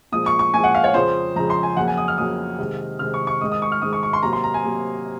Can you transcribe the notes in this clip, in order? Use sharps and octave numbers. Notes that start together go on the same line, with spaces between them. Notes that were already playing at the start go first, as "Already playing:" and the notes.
A#2 F3 G#3 D#6
C#6
C#6
A#2 F3 G#3 G#5
F#5
F5
C#5
F2 C#3 F3 G#3 C5
F2 C#3 F3 G#3 A#5
C6
G#5
F2 C#3 F#3 A#3 F#5
G#5
D#6
F6
F2 C#3 F#3 A#3 D#6
C3 D#3 G#3
C3 D#3 G#3 F6
C#6
C#6
G#2 D#3 G#3 D#6
D#6
C#6
F6
G#2 D#3 G#3 D#6
C#6
C#6
C6
C3 F#3 A#3 A#5
C6
A#5
G#5
C3 F#3 A#3